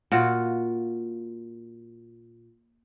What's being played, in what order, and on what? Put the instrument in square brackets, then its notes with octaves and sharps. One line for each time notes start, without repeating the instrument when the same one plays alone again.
[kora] A#2 F4 F#4